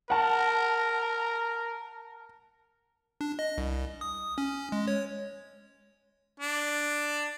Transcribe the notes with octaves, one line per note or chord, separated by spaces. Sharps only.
A#4 F#5 A5
D4
D#5
C2
D#6
C#4
G#3
C#5
D4